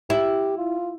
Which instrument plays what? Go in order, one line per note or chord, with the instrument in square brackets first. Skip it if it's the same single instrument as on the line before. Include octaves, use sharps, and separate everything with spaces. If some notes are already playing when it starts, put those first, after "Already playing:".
[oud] E4 [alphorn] G4
[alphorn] F4